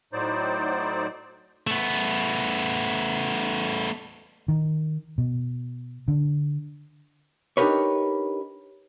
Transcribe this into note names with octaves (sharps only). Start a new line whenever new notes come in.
A2 F#3 D#4 C5 D5
A3 B3
D#3
B2
D3
D4 D#4 G4 A#4 B4 C#5